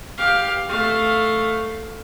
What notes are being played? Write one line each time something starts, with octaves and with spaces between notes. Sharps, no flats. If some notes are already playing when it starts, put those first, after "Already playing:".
G4 F5
A3 F5